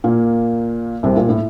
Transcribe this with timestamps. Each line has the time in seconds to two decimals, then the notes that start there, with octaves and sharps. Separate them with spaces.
0.04 A#2 A#3
1.03 C2 C3
1.16 A#2
1.29 A2